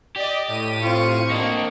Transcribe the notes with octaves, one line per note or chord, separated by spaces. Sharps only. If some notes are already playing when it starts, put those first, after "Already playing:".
G4 D5 D#5
A2 D#7
C4 F4 C#6
A#3 D4 D#5